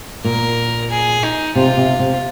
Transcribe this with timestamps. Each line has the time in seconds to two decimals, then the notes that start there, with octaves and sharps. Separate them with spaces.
0.24 A#2 A#4
0.90 G#4
1.23 D#4
1.55 C3 F4
1.77 C3
1.99 C3